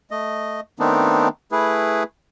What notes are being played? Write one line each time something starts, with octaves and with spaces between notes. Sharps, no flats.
A3 D#5
D#3 A3 B3 C4 D4 D#4
A3 E4 G#4 B4